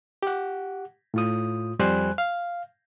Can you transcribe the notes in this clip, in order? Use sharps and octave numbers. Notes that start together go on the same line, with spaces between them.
G4 F#5
A2 F4 D#6
F2 G3 C5 G#5 F#6
F5